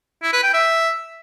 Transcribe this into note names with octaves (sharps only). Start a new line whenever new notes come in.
E4
B4
G5
E5